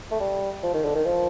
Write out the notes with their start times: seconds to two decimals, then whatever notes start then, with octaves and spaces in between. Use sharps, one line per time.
0.11 A3
0.20 G3
0.63 F3
0.74 D#3
0.85 D3
0.95 D#3
1.05 F3